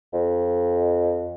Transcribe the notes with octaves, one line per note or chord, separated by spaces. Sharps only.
F2